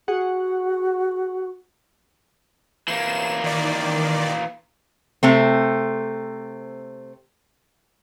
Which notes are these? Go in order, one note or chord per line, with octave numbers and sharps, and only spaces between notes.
F#4 G#4 F#5
E3 A#3 E7
D#3 D5
C3 A3 C4